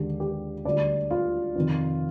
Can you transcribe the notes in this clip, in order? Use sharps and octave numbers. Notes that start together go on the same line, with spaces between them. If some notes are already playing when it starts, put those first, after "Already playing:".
Already playing: D#2 D3 G#3 G4
G4
D2 D3 G3 D5
F4
F2 C3 D#3